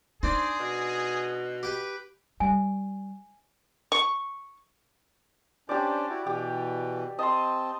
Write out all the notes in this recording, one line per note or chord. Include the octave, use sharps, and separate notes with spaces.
C4 D4 D#4 G#4 C5
B2
G4 B4 G5
G3 G#5
C#6
C#4 D4 G4 C5 D5
E4 F#4
B2 E3 G4
C4 D#5 A5 C6